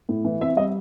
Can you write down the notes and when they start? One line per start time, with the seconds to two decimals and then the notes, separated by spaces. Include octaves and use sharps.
0.09 A2
0.25 E3
0.41 C4 E5
0.57 G3 D#5